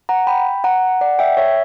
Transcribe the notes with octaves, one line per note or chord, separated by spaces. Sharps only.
F#5 A#5
G5 B5
F#5 A#5
D5 F#5
E5 G5
C#5 E5